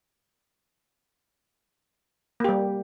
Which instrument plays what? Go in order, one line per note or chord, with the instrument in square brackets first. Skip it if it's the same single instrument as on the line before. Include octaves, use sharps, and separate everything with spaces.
[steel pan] A#3
G4
G3